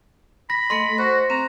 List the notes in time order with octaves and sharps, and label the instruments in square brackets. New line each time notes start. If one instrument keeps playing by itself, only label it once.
[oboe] B5 [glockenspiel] A#6
[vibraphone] A3 A4 D#5 [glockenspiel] C6
[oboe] F#4 [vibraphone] C5
[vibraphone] C4 [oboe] A#5